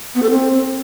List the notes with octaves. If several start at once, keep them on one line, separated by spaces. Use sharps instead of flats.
B3
A4
C4